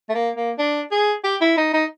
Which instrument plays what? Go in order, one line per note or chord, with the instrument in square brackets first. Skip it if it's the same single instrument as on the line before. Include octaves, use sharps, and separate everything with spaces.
[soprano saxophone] A3
A#3
A#3
D4
G#4
G4
E4
D#4
D#4